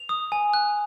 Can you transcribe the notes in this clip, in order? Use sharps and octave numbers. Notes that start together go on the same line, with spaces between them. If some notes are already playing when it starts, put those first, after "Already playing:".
Already playing: F7
D#6
G#5
F#6